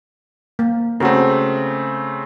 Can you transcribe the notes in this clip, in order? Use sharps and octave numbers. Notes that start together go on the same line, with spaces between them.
A#3
C#3 A3 C4 F#4 A#4